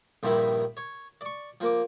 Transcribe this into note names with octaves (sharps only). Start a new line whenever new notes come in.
A#1 G2 D#3 E4 A#4 B5
C#5
D5 C#6
F3 A#3 D6